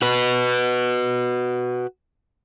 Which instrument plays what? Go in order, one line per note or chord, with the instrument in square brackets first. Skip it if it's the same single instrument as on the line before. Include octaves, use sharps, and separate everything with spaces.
[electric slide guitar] F#4 B4